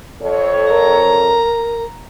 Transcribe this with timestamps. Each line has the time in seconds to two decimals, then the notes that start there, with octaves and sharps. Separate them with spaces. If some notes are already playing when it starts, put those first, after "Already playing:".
0.23 F2 A4 C#5
0.70 A#4 A#5